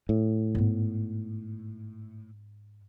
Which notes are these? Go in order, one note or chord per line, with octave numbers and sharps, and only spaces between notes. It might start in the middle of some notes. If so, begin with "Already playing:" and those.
A2
G#2 B3